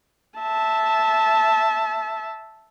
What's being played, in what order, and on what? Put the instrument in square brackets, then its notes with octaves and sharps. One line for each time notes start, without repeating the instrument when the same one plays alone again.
[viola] E5 A5